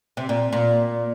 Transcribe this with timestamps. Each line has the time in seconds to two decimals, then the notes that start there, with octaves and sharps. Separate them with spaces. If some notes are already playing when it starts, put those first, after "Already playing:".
0.17 C3
0.29 A#2
0.53 A#2